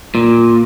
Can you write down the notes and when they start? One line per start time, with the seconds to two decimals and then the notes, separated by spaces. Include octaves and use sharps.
0.15 A#2